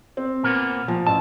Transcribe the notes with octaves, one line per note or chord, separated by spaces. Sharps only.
C4
A#2 A#3 B3
A#2 F3
A1 A5